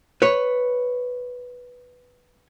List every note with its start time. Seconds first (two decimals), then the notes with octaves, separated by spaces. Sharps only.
0.22 B4 C#5